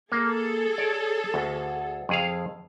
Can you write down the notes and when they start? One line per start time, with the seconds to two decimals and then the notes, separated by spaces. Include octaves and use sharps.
0.12 A#3 G#4 A4
0.78 C#5 D5
1.34 D2
2.09 F2 G#4 F5